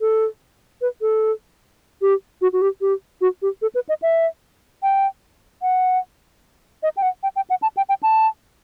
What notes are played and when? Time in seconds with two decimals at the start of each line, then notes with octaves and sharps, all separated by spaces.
0.01 A4
0.81 B4
1.01 A4
2.01 G4
2.41 F#4
2.53 F#4
2.61 G4
2.81 G4
3.21 F#4
3.42 G4
3.62 A4
3.75 B4
3.89 D#5
4.02 E5
4.83 G5
5.62 F#5
6.83 D#5
6.97 G5
7.02 F#5
7.23 G5
7.36 G5
7.50 F#5
7.62 A5
7.77 G5
7.89 G5
8.03 A5